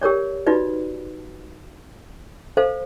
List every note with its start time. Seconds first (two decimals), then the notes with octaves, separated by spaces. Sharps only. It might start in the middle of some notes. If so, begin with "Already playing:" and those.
0.01 G4 A#4 C#5 D5
0.47 D#4 F4 F#4 B4 D5
2.57 A4 C5 F5